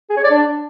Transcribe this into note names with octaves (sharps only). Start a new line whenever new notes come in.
G#4
C#5
D5
D4